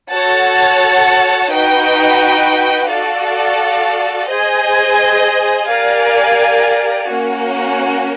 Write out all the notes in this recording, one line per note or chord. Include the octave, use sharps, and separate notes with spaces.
F#4 A4 C#5 F#5 A5
D#4 F#4 B4 D#5 G5
F#4 A4 D5 F5
G#4 C5 D#5 G#5
G4 A#4 D5 F5 G#5
A#3 C#4 F#4